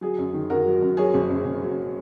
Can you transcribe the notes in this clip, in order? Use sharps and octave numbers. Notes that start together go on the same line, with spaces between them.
F#3 G#4
F#2
D#3
F#2 F#4 A#4
F#3
F#2
F#3 G#4 C#5
F#1
F#2
F#1
F#3